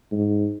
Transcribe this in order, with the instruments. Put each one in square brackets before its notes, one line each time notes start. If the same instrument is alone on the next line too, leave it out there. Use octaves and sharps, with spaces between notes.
[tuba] G#2